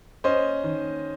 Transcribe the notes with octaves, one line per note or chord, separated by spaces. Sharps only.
C#4 C5 D#5
D#3